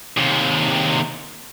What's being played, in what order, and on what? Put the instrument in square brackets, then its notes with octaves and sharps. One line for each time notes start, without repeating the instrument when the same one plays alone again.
[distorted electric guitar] D#2 C3